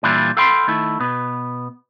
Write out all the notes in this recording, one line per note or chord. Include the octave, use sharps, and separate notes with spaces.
A#2 E3 G3 D4 E4 F4
A4 F5 G5 B5 C6
D#3 A3 E4
B2 B3